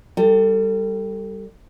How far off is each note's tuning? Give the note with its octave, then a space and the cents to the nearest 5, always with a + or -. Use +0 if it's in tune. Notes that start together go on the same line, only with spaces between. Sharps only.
G3 +0 A4 +30